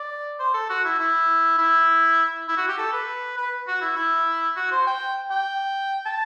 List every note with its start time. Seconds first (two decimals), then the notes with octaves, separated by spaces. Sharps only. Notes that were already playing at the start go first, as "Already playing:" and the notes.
Already playing: D5
0.39 C5
0.54 A4
0.70 F#4
0.85 E4
0.99 E4
1.58 E4
2.48 E4
2.57 F#4
2.68 G4
2.78 A4
2.93 B4
3.37 B4
3.67 F#4
3.82 E4
3.96 E4
4.56 F#4
4.71 C5
4.87 G5
5.31 G5
6.06 A5